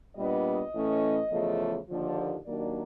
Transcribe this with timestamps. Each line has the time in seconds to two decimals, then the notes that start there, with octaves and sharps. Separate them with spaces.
0.16 A#2 G3 B3 D4 D#5
0.74 A2 E3 A3 C#4
1.31 E2 C#3 F3 A3
1.89 D#2 D3 F3
2.46 D#2 D#3 F#3 A#3 D4 D5